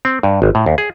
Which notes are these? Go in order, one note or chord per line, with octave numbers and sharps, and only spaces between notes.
C4
G2
G#1
A2
D#2
G#4